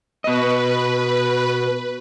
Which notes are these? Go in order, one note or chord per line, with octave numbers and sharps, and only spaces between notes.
B2 B4 D#5